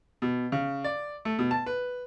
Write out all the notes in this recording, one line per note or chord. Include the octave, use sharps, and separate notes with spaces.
B2
C#3
D5
A3
B2
A5
B4